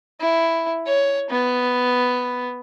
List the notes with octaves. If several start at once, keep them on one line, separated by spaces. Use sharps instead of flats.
E4
C#5
B3